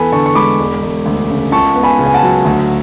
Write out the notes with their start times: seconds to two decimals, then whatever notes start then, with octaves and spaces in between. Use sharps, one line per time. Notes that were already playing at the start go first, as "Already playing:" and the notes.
Already playing: E2 B3 A4 G#5 B5
0.12 D3 A5 C#6
0.26 C#6
0.35 G#3 B5 D6
0.59 E1
0.82 E1
1.06 D2
1.29 C#3
1.52 C#2 A5 C#6
1.75 B3
1.83 G#5 B5
1.99 C#3
2.06 G#5
2.14 F#5 A5
2.23 F#3
2.45 D2